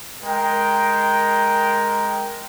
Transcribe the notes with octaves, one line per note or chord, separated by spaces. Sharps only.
G#3 A#4 G5